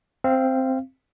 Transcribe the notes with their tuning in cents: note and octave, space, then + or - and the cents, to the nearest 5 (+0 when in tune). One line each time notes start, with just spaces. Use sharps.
C4 +0 F5 -25